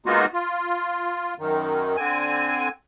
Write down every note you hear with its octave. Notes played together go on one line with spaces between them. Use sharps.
G#3 A#3 B3 D#4 F4 F#4
F4
F#2 D#3
D3 C4 G#5